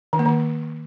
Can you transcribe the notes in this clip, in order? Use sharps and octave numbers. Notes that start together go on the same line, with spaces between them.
D#3
A#3
D#3